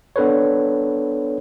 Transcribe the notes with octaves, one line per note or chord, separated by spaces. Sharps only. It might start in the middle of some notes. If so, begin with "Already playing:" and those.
B3 D4 A4 B4 C#5